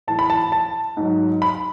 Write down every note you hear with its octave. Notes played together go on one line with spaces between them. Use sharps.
A2 E3 A5
B5
A5
A5
G#2 F#3
B5